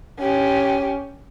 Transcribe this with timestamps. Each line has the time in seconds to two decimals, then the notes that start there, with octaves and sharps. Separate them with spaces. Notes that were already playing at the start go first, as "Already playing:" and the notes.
0.20 C#4 G4